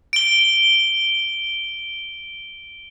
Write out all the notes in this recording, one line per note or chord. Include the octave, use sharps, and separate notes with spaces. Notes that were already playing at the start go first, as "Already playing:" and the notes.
D7 G7